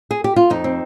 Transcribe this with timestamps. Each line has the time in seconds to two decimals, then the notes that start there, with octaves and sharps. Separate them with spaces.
0.11 G#4
0.24 G4
0.36 F4
0.50 F2 D#4
0.64 C4